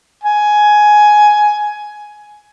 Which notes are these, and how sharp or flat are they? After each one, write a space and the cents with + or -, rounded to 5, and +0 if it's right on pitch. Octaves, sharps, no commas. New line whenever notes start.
G#5 +10